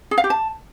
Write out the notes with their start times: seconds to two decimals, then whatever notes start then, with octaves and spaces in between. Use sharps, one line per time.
0.11 G#4
0.18 F5
0.24 G4
0.30 A5